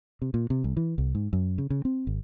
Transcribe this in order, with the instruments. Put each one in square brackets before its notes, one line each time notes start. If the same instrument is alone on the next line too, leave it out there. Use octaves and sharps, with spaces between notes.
[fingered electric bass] C3
A#2
C3
C2
E3
C2
G#2
F#2
C#3
C#3
C4
G#1